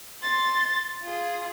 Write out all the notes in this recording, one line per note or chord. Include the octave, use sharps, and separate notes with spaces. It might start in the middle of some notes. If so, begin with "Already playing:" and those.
C6 A6
F4 G#4